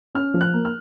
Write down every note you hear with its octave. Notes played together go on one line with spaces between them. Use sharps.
C#4 F6
F3
F#6
A#3
F6